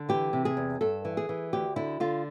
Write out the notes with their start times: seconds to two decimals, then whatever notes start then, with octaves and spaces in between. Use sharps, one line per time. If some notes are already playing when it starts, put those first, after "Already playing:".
Already playing: D3
0.09 E3 G4
0.33 C3
0.45 G#4
0.57 E2
0.81 G2 A4
1.05 E3
1.17 G#4
1.29 E3
1.53 D2 G4
1.76 D3 E4
2.00 D3 F4